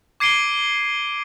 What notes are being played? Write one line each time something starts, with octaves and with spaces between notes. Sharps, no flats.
D6 G#6 C7 D7 D#7 G7